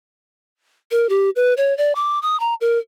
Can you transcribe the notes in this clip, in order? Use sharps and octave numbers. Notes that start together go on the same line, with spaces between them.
A#4
G4
B4
C#5
D5
D6
D#6
A#5
A#4